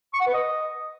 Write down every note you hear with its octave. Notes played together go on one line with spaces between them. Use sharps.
C#6
F#5
B4
D#5